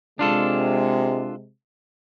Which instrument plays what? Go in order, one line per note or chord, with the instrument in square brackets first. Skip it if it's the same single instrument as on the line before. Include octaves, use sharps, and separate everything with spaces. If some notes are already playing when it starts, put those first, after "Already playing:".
[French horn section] C3 G#3 [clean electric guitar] D4 F4 A4